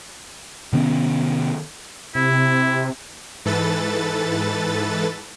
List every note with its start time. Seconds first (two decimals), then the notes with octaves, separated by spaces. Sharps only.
0.73 C3 D#3 B3 C#4
2.15 C3 E4
3.45 G#2 E3 A4 B4 A6